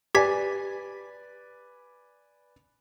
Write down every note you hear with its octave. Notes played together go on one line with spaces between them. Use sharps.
G4 B4 D5 G#5 G#6 B6